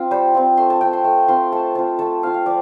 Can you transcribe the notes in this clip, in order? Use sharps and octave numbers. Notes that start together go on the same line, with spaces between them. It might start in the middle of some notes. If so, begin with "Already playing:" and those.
Already playing: C4 F4 G5
G3 C5
C4 F4
A3 C6
A5
C4 F4 G5
C6
A3
C4 F4 C6
A3 A5
C4 F4 A5
A3 A5
C4 F4 F5
F5
F3 D5